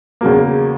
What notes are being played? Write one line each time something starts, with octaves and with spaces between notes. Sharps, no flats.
E2 C#3 F#3 A#3